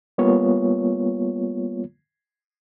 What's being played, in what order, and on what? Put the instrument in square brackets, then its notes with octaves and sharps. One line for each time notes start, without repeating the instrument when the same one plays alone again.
[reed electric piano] G3 A#3 B3 F4 C#5